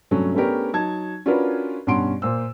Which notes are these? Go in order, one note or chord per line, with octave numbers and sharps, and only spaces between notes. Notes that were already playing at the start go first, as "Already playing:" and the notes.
G2 C3 F#3 A3 C#4
A3 B3 C#4 D4 G4 A#4
F#3 D#4 A5 G#6
C#4 D4 F4 F#4 A#4 B4
G2 B2 C#4 F#5 C6 D7
A#2 C5 E6